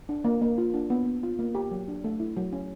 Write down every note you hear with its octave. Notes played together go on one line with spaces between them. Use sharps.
D4
A#3
A#3
F4
D4
B3
B3
F4
A#3
G4
F#3
D4
A3
E4
F#3
C#4